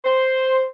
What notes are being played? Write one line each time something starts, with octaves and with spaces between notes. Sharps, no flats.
C5